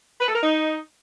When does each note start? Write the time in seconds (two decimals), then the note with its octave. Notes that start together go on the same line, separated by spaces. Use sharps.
0.21 B4
0.28 A4
0.35 A#4
0.43 D#4